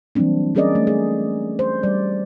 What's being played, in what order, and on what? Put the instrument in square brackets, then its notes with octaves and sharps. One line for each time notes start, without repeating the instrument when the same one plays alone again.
[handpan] E3 F#3 G3 A#3 C4 D4
G3 C#4 G#4 A#4 D5 D#5
A3
G#4
C5
G3 D5